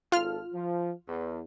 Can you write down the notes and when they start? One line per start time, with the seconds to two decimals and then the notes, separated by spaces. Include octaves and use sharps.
0.12 G#1 F4 A4 F6
0.53 F3
1.07 E2